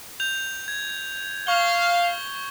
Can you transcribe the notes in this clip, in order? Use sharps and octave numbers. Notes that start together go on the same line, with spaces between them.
G6 F7
G#6
F5 C#6 G7